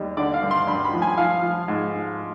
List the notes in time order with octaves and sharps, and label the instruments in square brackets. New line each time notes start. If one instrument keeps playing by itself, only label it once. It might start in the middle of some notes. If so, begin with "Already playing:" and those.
Already playing: [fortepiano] D#2 G3
D3 D5
F5
G2
C6
G2 B5
B5
F3
G#5
F3 F5
F3
G#2